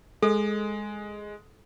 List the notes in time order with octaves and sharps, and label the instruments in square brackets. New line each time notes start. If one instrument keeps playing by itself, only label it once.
[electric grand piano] G#3 [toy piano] A4